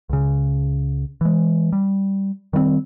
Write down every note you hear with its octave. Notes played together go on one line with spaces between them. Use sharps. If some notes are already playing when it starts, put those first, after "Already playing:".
C#2 C#3
E3 G#3
G3
D#3 G3 A3 C4